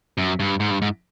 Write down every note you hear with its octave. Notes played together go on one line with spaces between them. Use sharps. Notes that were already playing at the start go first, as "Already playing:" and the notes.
F#2
G2
G#2
G2
G#2